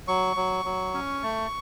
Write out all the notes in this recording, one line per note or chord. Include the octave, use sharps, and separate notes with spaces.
F#3 C#6
F#3
F#3
C#4
A3